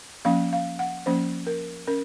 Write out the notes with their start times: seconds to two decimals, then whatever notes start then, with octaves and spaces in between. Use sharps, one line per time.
0.25 F3 A#3 C#4 F5
0.53 F5
0.79 F#5
1.06 F3 A#3 C#4 C5
1.47 A#4
1.87 C#4 A#4